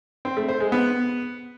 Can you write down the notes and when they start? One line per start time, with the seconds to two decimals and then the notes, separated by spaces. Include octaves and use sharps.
0.25 C4
0.37 A3
0.49 C5
0.60 G#3
0.72 B3